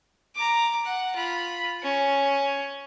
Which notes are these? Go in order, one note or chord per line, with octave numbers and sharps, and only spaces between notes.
A#5 D6
F#5
F4 B5
C#4